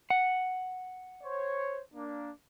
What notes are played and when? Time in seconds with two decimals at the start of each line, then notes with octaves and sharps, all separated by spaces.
0.10 F#5
1.23 C5 C#5
1.94 A#3 D4